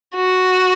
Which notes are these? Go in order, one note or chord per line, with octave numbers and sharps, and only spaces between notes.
F#4